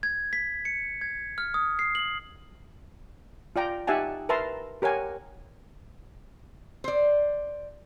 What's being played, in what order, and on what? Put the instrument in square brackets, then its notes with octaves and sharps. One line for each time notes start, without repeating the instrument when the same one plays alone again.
[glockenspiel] G#6
B6
C#7
G#6
F6
D#6
C7
F#7
[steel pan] F4 D5 G5 A#5
D#4 G4 E5 F#5 G#5 A5
A#4 B4 E5 A5 A#5 C6
G4 A#4 C#5 F#5 G#5
[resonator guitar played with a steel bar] C5 D5